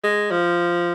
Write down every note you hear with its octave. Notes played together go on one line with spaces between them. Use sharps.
G#3
F3